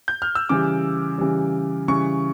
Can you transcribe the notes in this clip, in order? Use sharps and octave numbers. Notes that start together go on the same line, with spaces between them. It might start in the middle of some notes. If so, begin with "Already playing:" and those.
G6
F6
E6
C#3 E3 G3 D6
C#3 E3 G3
C#3 E3 G3 C#6